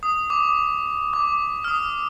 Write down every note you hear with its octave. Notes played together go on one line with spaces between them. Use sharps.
D#6
D6
D6
F6
D#6